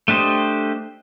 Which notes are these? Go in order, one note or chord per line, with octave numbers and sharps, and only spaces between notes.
A3 D4 G4 C5 D#5